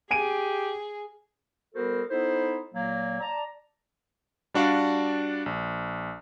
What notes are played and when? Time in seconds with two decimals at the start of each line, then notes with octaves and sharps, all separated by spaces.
0.11 G4 G#4 G#5 D7 D#7
1.75 G3 B3 F#4 A4 A#4 C5
2.10 B3 D#4 E4 A4 C5
2.73 A#2 F#3 A#3
3.20 D5 A5 A#5
4.54 G3 D4 F#4 D5 F5
5.46 A#1